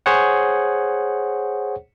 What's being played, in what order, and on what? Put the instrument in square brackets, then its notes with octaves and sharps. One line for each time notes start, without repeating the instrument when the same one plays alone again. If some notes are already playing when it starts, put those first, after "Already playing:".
[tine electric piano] G#4 C5 C#5 F#5